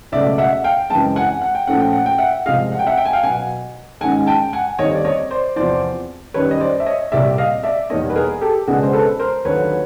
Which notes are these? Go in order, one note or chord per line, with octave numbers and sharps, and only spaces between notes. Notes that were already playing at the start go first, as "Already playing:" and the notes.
C#2 B2 F#3 A3 D5 E5
E5 F#5
F5 G5
F#2 C#3 E3 G#3 C4 G5 A5
F#5 G#5
F#5
G5
A#2 F3 A3 C#4 F#5
G5
F#5
G5
E5 F#5
C2 C3 F3 G#3 D#5 F5
F#5
G5
E5 F#5
G5
G#5
F5 G5
B2 F#3 B3 F#5 G#5
G#2 D#3 G#3 C#4 F#5 G#5
G5 A5
F#5 G#5
D#2 D3 G3 C4 D#4 C#5 D#5
D5
C#5 D#5
C5 D5
E2 C3 F3 C5 D5
F#2 D#3 G3 B4 C#5
D#5
C5 D5
E5
C#5 D#5
C2 A#2 G3 D5 E5
D#5 F5
D5 E5
E2 B2 G3 A#3 D#4 C#5 D#5
B4
G#4 A#4
G4 A4
C#2 B2 G#3 B3 D4 F#4 G#4
C5
A4 B4
A#4 C5
D#2 D3 F#3 B4 C#5